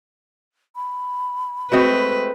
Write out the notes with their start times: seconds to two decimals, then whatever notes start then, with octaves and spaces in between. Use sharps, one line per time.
0.76 B5
1.72 G#3 A3 C4 F#4 B4 D#5